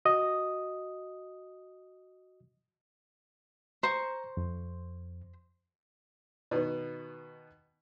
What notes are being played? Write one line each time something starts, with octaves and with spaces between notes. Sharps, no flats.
F#4 D#5 D#6
C5 A#5 C#6
F2
B2 D#3 B3